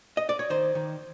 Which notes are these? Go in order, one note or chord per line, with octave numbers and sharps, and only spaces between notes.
D#5
D5
C#5
D#3 C5
D#3